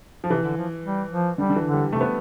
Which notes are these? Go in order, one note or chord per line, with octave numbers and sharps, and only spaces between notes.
F3
C3 E3
D3
F3
G3
F3
D3 G3
D3
E3
D3
G3
C3 A3
B3